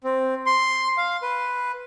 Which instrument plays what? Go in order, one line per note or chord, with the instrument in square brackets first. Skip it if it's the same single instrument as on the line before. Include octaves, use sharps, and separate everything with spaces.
[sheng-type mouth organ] C4
C6
F5
B4